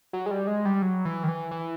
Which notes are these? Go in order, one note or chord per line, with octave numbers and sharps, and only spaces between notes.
F#3
G#3
G3
G#3
G3
F#3
E3
D#3
E3
E3